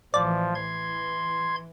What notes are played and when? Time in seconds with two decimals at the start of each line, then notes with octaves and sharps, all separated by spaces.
0.14 A1 E3 F3 D5
0.55 E3 C6 G#6